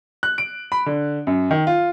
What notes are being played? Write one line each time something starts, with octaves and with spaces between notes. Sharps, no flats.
F#6
D7
B5
D3
F#2
D#3
F4